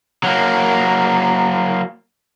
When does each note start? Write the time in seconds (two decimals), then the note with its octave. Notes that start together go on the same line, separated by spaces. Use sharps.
0.24 F#3 A#3